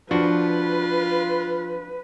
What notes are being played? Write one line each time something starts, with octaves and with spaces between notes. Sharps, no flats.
F3 D4 F4 F#4 B4